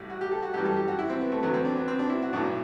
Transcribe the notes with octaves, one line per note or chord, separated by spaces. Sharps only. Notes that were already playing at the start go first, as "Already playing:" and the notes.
Already playing: A1 A2 G3
F#4
G4
A4
F#4
F#2 E3 G3 G4
A4
G4
F#4
E4
C4
B3
A3
E2 D3 F#3 B3
C4
D4
B3
C4
D4
E4
F#4
B1 A2 F#3 D4